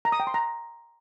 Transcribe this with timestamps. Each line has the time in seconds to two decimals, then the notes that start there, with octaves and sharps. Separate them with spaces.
0.05 A#5
0.12 D#6
0.20 G5
0.27 C6
0.34 A#5